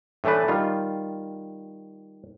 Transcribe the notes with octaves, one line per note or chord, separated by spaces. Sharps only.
A2 E3 A3 D4 B4
D#3 G3 F4